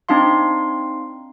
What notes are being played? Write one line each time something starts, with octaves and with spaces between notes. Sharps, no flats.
C4 D4 D#4 F5 C6